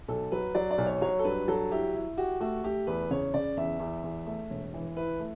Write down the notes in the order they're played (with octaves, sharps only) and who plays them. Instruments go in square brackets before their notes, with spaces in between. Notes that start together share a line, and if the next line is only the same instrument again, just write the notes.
[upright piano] B1 [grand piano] A4
[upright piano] F#3 [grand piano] B4
[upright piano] F#3 [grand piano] D5
[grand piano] D5
[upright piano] B1
[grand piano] C#5
[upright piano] F#3 [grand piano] C#5
[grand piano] A4
[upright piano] G2 [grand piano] B4
[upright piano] F#3 [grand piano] A4
[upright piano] E4 [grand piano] G4
[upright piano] E4
[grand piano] F#4 [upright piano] G4
[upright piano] A3 [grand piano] F#4
[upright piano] A3 [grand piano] G4
[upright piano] E2 [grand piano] B4
[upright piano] C#3 [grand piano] C#5
[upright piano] C#3 [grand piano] D5
[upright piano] E2 [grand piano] E5
[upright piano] E2
E2
A3
E1
E3
[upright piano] E4 [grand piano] B4
[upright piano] A3